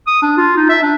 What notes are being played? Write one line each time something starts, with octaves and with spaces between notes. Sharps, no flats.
D#6
D4
F4
D#4
E5
D4